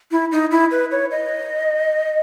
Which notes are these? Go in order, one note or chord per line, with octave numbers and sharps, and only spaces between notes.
E4
D#4
E4
B4
C#5
D#5